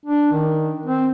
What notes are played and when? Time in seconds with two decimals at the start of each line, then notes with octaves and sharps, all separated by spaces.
0.05 D4
0.32 D#3
0.86 C4